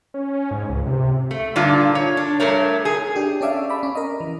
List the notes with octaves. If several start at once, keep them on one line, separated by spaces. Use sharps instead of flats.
C#4
G#2
C#2
C3
A3
G2 A#2 D3 D4 F4
C#5
D4
G2 E3 A3 A#4 C#5
G#4
D4 G4
C#4 A4 D5 E5 F5
D5 B5
C#4
A#4 D#5
E3